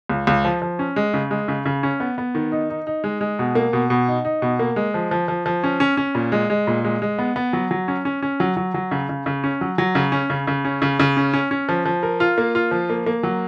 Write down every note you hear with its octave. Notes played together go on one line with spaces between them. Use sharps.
C#2
C#2
F3
F3
C#4
G#3
C#3
G#3
C#3
C#3
C#4
B3
B3
D#3
D#4
D#4
D#4
G#3
G#3
B2
A#3
B2
B2
D#4
D#4
B2
A#3
G#3
F3
F3
F3
F3
C#4
C#4
C#4
A#2
G#3
G#3
A#2
G#3
G#3
B3
B3
F#3
F#3
C#4
C#4
C#4
F#3
F#3
F#3
C#3
C#3
C#3
C#4
F#3
F#3
C#3
C#4
C#3
C#3
C#4
C#3
C#3
C#4
C#4
C#4
F3
F3
A#4
F4
A#3
F4
F3
A#3
A#3
F#3